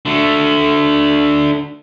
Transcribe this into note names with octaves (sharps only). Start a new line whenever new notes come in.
D3 A3